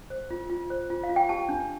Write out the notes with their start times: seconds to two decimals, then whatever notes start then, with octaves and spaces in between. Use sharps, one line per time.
0.10 C5
0.31 F4
0.50 F4
0.70 C5
0.90 F4
1.03 F5
1.09 F4
1.16 G5
1.29 G4 A5
1.49 D4